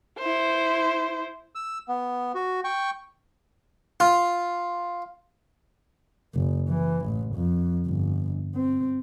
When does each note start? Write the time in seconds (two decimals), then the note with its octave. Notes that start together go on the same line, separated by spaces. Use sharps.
0.19 E4 C5
1.55 E6
1.89 B3
2.35 F#4
2.64 G5 C#6
4.00 F4
6.35 F#1
6.69 E3
7.06 A1
7.36 F2
7.87 G1
8.55 C4